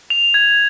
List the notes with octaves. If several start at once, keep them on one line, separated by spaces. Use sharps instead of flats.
F7
G#6